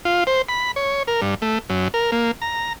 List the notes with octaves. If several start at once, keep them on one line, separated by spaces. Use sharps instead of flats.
F4
C5
B5
C#5
A#4
G2
A3
F#2
A#4
A#3
A#5